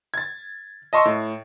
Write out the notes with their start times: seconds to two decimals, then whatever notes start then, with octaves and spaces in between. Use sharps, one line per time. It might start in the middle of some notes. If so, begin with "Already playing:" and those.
0.14 G#6 A6
0.93 D#5 A5 C6 C#6 D#6 E6
1.05 A2